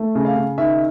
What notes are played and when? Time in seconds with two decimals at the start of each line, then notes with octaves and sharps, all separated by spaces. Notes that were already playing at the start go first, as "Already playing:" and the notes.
Already playing: A3
0.15 C#3
0.25 F5
0.36 C#3
0.58 D#3 E5